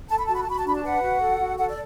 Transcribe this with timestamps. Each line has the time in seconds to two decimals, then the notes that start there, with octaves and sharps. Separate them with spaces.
0.09 A4 A5
0.18 B5
0.26 F#4 A5
0.34 B5
0.43 A5
0.48 F#4 B5
0.59 A5
0.65 D4 B5
0.74 A5
0.84 B4 F#5
1.03 F#4
1.22 A4
1.40 F#4
1.58 A4 F#5
1.69 D5